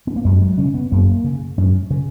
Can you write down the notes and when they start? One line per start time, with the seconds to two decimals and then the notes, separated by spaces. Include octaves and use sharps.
0.07 B3
0.16 A#3
0.25 F#2 G#3
0.42 F#3
0.58 C#3 C#4
0.74 B3
0.92 F#2 A#3
1.24 C#3
1.58 F#2
1.90 C#3